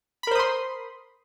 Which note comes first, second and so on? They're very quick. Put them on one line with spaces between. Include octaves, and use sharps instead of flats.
B5 A#4 C5 D#6 C6